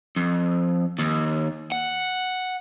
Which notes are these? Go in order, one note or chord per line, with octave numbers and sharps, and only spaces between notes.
F2
D#2
F#5